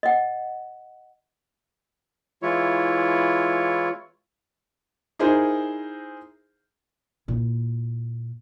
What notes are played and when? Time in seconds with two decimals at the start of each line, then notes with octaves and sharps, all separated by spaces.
0.03 D#5 F#5
2.42 E3 G#3 E4 F4 C#5
5.19 D#4 E4 G#4 A#4 C5
7.28 A#2 E4